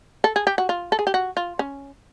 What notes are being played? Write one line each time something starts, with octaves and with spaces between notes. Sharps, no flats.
A4
G#4
G4
F#4
F4
A4
G#4
G4
F#4
F4
C#4